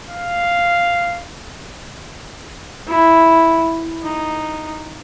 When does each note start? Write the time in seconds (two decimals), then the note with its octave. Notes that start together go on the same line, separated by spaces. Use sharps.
0.10 F5
2.87 E4
4.03 D#4